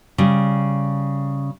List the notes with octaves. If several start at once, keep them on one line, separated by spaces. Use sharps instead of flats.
C#3 G3